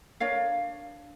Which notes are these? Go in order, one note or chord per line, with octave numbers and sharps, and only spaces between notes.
D4 A#4 C#5 F5